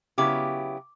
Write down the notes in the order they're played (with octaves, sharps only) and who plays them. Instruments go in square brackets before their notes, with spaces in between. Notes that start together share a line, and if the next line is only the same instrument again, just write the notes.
[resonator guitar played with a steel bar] C#3 F#3 B3 E4 G4 [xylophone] D6